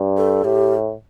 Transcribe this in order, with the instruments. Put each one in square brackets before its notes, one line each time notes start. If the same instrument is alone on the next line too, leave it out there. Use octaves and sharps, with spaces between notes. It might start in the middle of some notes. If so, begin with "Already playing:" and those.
Already playing: [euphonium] G2
[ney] A4
[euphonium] A2 [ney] G4